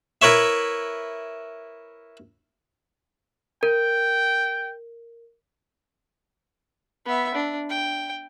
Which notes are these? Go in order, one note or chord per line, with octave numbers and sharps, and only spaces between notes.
E4 A#4 B4 C#5 E5
A#4 G5
B3 E5
D4
G5